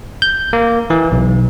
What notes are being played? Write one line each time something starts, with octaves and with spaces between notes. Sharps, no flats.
G6
A#3
E3
B1